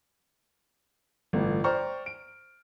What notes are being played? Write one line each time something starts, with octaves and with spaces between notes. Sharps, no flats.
G1 A2 E3
C5 D5 G5 A#5 C#6 F6
D7